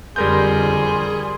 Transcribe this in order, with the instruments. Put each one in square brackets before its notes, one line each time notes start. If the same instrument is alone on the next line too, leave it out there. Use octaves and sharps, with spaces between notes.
[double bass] F2 D3 [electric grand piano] G3 A#4 G6 [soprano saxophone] G#4 [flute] C6